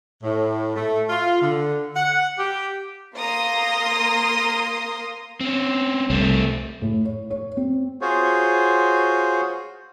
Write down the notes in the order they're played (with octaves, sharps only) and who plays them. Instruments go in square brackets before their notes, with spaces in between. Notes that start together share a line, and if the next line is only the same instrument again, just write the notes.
[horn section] A2
A3
F4
D3
F#5
G4
[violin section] A#3 A#5 C6 D#6
[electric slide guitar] C4 C#4
[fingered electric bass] C2 [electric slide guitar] A3 C4
[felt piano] A2
C#5
C#5
C4
[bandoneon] F4 F#4 G#4 C5 C#5